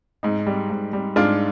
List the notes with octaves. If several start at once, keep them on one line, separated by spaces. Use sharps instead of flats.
G#2 D#4
G3
G#2
G3
G#2 D4 F4